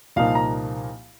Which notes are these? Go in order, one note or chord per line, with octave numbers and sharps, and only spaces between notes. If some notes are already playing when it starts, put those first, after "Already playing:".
C2 A#2 F3 A#3 D#4 F5
A#5